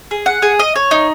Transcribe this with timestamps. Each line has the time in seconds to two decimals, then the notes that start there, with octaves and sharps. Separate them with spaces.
0.11 G#4
0.26 F#5
0.42 G#4
0.59 D#5
0.76 C#5
0.91 D#4